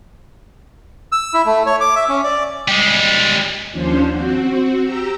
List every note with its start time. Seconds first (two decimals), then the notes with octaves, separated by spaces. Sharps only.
1.12 E6
1.34 E4
1.46 A3
1.66 C#5
1.80 D6
1.95 E5
2.09 C#4
2.24 D5
2.68 G3 G#3
3.71 D#2 F3 C#4 D4 C5
4.10 C4 F#4
4.81 G4 A#5 E6